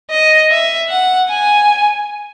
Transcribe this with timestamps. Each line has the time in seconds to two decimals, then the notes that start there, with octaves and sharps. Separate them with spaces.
0.10 D#5
0.50 E5
0.89 F#5
1.29 G#5